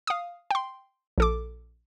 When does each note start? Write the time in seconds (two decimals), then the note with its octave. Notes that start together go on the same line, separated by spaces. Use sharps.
0.07 F5 D#6
0.51 G5 C6
1.18 A#1 A4 D6